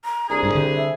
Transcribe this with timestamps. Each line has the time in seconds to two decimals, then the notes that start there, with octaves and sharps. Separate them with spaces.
0.05 A#5
0.30 C2 D4 G#4 A#5
0.43 G2
0.55 D3 G4
0.74 E5